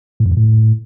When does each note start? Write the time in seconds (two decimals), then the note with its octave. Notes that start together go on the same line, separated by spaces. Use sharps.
0.20 A2
0.26 F#2
0.31 F2
0.37 A2